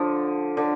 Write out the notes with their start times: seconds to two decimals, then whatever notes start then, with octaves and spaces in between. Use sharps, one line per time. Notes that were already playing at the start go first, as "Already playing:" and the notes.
Already playing: D3 F3
0.57 D3